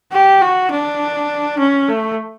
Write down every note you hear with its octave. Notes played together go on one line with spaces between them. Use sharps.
G4
F#4
D4
C#4
A3